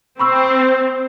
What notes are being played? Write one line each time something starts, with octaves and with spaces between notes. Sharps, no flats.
C4 B5 C#6 E6